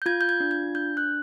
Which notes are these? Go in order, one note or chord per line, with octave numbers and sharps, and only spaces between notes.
G6
F4 G#6
G6
G#6
D4
G#6
D4 G6
F#6